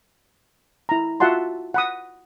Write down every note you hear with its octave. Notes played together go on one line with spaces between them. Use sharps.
E4 A#5
F4 F#4 E5 F#5 A5 C6
F#5 B5 D#6